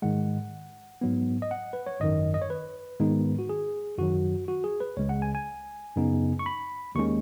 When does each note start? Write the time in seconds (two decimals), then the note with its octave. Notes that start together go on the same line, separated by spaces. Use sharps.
0.02 G#2 D#3 G#3 F#5
1.01 G#2 F#3 B3
1.42 D#5
1.51 F#5
1.73 B4
1.87 C#5
2.00 G#1 F#2 D#3 D#5
2.34 D#5
2.42 C#5
2.50 B4
2.99 G#2 D#3 G#3 B3 D#4
3.39 F#4
3.49 G#4
3.98 F#2 D#3 F#3 F#4
4.48 F#4
4.64 G#4
4.80 B4
4.97 C#2 C#3 G#3 C#5
5.09 F#5
5.22 G#5
5.35 G#5
5.96 F#2 C#3 B3 D#4
6.39 C#6
6.46 B5
6.95 D#2 D#3 G#3 C#4 C#6